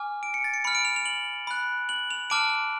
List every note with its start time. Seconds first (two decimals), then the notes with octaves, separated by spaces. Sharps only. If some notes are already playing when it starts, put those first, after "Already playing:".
Already playing: G#5 D6 F6
0.23 D7
0.34 C#7
0.44 A6
0.54 C#7
0.64 B5 F6 C#7
0.75 D7
0.85 F7
0.96 F7
1.06 F#7
1.47 B5 F#6
1.89 F#7
2.11 F7
2.30 A5 D6 F6 D7